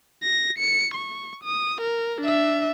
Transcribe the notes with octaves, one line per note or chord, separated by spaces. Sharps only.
A#6
C#7
C#6
D#6
A#4
D4 E5